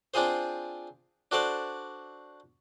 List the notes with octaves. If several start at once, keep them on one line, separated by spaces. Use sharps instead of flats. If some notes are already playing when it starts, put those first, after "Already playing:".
C4 D4 F4 G#4 C5
D4 F#4 A4 C5 D5